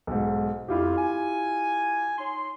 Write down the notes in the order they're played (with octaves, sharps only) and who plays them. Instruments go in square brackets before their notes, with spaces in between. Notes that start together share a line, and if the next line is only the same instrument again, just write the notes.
[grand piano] B1 G#2
[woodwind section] F2 [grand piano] E4 F4 G4
[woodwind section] G#5
D#4 C#5 C6